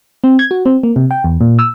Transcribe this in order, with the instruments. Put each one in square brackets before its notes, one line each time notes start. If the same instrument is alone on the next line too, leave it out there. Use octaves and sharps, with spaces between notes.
[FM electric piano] C4
G#6
F#4
C4
A#3
C3
G5
E2
A#2
E6